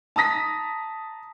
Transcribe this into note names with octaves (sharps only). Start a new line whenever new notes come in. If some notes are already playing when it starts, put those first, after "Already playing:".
A5 A#5 D#6 A#6 B6